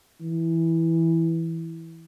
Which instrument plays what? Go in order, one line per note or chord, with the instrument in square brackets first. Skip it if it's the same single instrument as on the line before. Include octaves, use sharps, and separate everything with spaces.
[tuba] E3